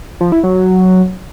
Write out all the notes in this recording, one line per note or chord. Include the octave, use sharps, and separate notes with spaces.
F3
E4
F#3